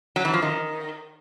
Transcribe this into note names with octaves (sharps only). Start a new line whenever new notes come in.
F#3
E3
F3
D#3